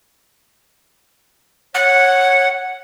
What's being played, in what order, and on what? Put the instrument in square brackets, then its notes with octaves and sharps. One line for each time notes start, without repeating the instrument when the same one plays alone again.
[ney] C#5 [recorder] F#5